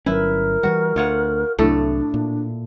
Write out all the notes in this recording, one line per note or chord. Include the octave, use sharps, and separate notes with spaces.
G1 F#3 C#4 E4 A#4 B4
E3 F3 G3 F#4
D2 F4 C#5 F#5
C2 A2 F#3 A3 D4 A4
A#2